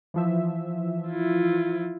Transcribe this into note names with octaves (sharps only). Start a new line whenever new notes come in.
E3 F3 E5
E4 F4